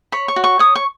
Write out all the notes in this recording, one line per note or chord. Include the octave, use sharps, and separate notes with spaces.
C#5 B5
C#6
F#4
C#6
C#5 D#6
C#6